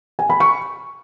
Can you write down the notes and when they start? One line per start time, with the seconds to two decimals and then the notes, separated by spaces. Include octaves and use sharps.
0.19 G#5
0.30 B5
0.40 C#6